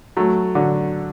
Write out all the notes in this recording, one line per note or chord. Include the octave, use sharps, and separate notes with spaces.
F#3 A3
D3 F#3